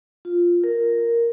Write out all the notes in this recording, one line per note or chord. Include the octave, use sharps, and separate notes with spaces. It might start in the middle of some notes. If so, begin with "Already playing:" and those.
F4
A#4